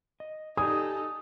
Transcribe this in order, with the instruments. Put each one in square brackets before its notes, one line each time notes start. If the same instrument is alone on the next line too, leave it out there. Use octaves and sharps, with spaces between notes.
[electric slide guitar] D#5
[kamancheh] D#4 A4 [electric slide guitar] G4 D5 G#5 [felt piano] D#6